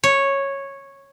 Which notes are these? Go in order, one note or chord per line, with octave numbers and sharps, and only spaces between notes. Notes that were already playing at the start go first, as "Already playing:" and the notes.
C#5